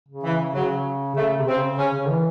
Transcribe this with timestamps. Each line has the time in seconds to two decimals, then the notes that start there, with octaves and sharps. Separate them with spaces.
0.09 C#3
0.23 E3
0.54 C#3 F#3
1.16 C#3 A3
1.38 C3
1.47 C#3 C4
1.77 C#3 C#4
1.94 C#3
2.09 E3